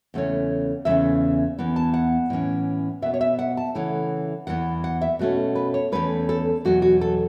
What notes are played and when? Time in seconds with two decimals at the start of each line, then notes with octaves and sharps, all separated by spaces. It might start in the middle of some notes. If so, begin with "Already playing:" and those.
0.14 E2 C#3 A3 C#4
0.85 E2 C#3 A3 C#4 E5
1.58 E2 E3 B3
1.76 A5
1.94 F#5
2.30 A2 E3 C#4
3.02 B2 B3 E5
3.14 C#5
3.21 E5
3.39 F#5
3.57 A5
3.75 C#3 E3 A3 C#4 F#5
4.47 E2 E3 B3 F#5
4.84 F#5
5.01 E5
5.19 B2 A3 C#4 F#4
5.55 B4
5.74 C#5
5.92 E2 B2 A3 C#4 B4
6.29 A4
6.65 E2 B2 F#3 F#4
6.82 F#4
7.01 A4